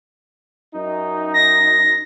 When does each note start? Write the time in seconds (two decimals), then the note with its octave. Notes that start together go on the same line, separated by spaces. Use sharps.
0.74 F#2 D#4
1.34 A#6